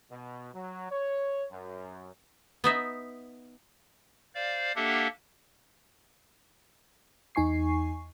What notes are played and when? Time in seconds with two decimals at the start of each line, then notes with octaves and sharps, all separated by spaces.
0.11 B2
0.54 F#3
0.91 C#5
1.51 F#2
2.64 B3 D#4 E5
4.35 C5 D5 F5
4.76 A#3 D4 G4 A4 E5 F#5
7.35 E2 D#4 G#5 C#6 C7